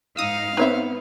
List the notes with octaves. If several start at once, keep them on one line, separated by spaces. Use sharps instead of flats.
G#2 D#4 F5 D#6 E6
B3 C4 D#4 B4 C#5 E5